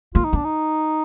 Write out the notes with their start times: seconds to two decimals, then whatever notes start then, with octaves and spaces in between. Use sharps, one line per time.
0.15 A#3 F4
0.25 D#4
0.33 B3
0.35 D4
0.45 D#4